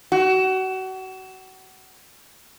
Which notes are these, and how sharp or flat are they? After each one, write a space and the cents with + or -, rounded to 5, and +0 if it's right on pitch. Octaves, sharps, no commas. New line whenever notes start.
F#4 +30